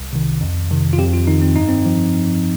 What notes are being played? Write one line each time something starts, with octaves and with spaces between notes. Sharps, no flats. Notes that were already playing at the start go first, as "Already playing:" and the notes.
Already playing: C2
C3 D#3
F2
C3 D#3
F4
F2 G4
F4
D#3 D#4
C4
G2 D#4
C4
F3